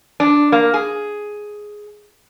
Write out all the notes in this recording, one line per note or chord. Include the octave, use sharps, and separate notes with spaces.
D4
A#3
G#4